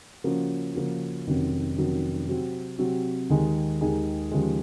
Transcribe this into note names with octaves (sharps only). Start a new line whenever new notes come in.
C#3 F3 A#3 C#4 F#4
C#3 F3 A#3 C#4 F#4
F1 F2 D#3 F#3 C#4
F1 F2 D#3 F#3 C#4
C3 F#3 C4 F#4
C3 F#3 C4 F#4
D#2 D#3 G#3 D#4 G#4
D#2 D#3 G#3 D#4 G#4
D#2 C#3 F3 G#3